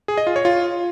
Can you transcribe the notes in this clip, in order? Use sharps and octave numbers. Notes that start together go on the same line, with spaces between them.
G#4
D#5
F4
C#5
F4